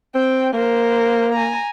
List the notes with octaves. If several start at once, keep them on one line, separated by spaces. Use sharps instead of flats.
C4 G5
A#3 A#4 C5
G#5 A#5